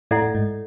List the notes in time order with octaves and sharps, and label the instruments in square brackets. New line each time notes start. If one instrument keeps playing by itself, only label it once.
[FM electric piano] A2 [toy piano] E4 A4 D5 F#5
[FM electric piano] A2
G#2